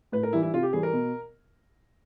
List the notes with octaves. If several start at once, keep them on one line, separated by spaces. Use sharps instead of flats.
A2 B4
A#4
E3 G3 E4
E4
C3 F4
G4
E3 G3 G#4
A#4
B2